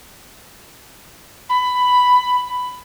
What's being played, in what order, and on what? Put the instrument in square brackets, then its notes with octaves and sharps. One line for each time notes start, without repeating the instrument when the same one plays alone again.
[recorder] B5